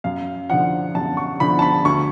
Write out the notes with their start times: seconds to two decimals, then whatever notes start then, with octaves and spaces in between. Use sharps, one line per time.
0.04 F#2 F5
0.50 D3 F3 F#5
0.95 F#2 A5
1.17 C#6
1.40 D3 F3 B5
1.59 A5
1.62 B5
1.85 D2 C#6